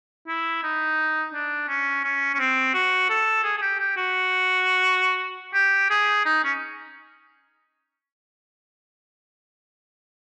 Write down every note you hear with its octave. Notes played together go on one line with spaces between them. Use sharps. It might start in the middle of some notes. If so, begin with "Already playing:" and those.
E4
D#4
D4
C#4
C#4
C#4
C4
F#4
A4
G#4
G#4
G4
G4
F#4
G4
G#4
D#4
C#4